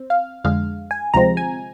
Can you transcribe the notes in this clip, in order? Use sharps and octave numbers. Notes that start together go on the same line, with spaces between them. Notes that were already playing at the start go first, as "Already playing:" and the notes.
Already playing: C4
F5
F2 D3 G#3 F5
G#5
D2 C3 F3 G#3 C4 A#5
G#5